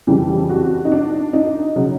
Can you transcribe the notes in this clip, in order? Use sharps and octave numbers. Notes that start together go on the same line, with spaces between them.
F2 C#3 E3 G3 G4
G4
F#4
D#4
D4
D#4
C#3 F#3